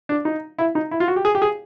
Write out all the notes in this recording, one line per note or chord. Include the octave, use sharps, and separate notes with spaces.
D4
D#4
E4
D#4
E4
F4
F#4
G4
G#4
G4
G#4